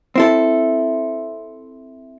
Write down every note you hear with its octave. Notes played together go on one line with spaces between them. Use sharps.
C4 E4 A4